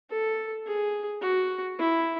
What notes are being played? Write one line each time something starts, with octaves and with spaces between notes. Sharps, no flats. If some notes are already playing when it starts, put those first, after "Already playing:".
A4
G#4
F#4
E4